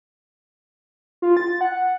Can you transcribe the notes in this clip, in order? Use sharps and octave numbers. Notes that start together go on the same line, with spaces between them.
F4
A6
F#5